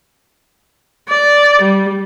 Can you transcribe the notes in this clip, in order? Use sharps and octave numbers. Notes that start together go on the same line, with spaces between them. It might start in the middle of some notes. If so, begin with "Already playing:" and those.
D5
G3